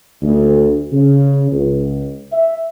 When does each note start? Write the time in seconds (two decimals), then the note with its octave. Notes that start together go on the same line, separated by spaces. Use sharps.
0.22 D2
0.92 C#3
1.52 C#2
2.32 E5